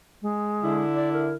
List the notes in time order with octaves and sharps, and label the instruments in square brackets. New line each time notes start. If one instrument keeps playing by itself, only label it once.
[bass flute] G#3
[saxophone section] D3 E4
[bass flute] D5
A#4